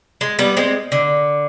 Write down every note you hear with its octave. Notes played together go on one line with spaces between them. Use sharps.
G#3
G3 B3
G#3 C4
D3